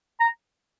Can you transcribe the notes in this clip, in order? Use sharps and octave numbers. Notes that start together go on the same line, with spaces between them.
A#5